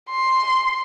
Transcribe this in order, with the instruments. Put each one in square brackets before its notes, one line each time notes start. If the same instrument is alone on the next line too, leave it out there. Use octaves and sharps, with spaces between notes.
[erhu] C6